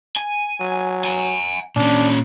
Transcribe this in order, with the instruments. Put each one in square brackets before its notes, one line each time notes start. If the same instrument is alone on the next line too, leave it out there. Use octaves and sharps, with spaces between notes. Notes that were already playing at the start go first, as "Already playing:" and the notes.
[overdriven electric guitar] G#5
[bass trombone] F#3
[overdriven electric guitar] F#5 G#5
[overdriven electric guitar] A#2 C#4 [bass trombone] D4